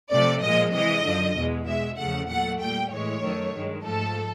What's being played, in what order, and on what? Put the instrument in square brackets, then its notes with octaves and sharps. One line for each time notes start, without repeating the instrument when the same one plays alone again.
[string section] C3 F3 A3 D5
A#2 F3 G#3 D#5
C3 E3 G#3 D#5
F#2 D3 F3
E2 B2 G#3
B2 G#3 E5
E2 C#3 F3 A3 F#5
A#2 F#3 A3 F#5
A#2 G3 G5
A2 E3 G#3 C#5
F#2 D#3 F#3 A3
G2 D#3 G#3
G#2 F3 A3 A4